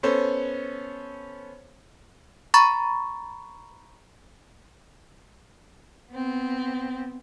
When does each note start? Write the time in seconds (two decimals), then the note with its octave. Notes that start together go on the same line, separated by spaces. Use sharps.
0.03 B3 C#4 A4 C5 C#5
2.54 A#5 B5 C#6 A6
6.11 B3 C4